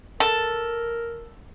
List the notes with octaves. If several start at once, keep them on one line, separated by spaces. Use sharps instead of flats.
A4 A#4